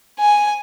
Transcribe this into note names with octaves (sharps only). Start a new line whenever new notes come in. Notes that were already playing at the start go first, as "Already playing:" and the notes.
G#5